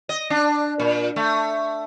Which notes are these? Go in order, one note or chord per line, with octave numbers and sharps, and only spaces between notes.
D#5
D4
A#2
A3